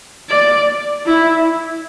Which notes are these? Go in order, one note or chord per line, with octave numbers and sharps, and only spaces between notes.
D5
E4